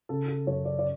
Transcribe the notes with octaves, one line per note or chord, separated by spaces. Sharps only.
C#3 A4
A4
F#2 C#5
D5
D5